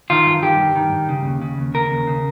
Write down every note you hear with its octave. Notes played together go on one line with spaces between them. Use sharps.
D#3 F4
G2
D#3 G4
G2
D#3
G2
C#3
D#2
C#3
D#2
C#3 A#4
D#2
C#3